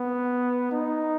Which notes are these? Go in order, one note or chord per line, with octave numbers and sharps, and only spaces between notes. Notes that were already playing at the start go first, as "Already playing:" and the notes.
Already playing: B3
D#4